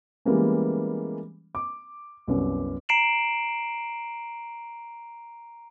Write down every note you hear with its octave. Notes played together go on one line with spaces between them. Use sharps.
E3 G3 G#3 A#3 B3 C#4
D6
C2 F#2 B3
A#5 C7 D7 E7 F#7